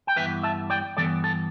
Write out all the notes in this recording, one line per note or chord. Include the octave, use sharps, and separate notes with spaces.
G5
G2 E3 B3 B4 E5
E5 A5
D5 G5
G2 E3 B3 A4 D5
A4